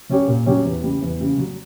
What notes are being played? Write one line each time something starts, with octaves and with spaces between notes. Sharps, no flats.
F#3 C#4 G4 C#5
A#2
F#3 C#4 G4 C#5
E2
C#3 G3
E2
C#3 G3
F#3